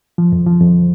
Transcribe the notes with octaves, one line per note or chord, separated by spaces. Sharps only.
F3
F2
F3
F2